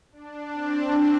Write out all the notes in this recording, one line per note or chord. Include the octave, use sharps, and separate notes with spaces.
D4
C4